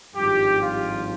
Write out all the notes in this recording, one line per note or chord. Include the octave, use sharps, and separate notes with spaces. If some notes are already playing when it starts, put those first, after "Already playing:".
G#1 G2 F3 G4
F4